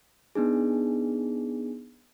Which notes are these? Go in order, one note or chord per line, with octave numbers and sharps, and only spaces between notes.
B3 D4 D#4 G#4